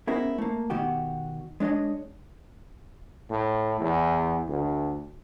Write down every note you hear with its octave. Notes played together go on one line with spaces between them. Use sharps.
B3 C#4 E4 G#4 A#4 C5
A3 A#3
B2 D#3 F#4 G4
G#3 D4 C#5 D#5
A2
E2
D2